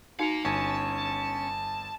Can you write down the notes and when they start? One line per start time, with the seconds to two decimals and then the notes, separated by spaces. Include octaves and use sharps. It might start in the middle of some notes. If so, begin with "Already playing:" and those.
0.20 D#4 F#4 F5 A#5 C#7
0.45 G1 C#4 G#5 A5